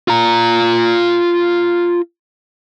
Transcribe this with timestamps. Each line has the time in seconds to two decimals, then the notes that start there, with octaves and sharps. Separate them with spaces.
0.08 F4 A#5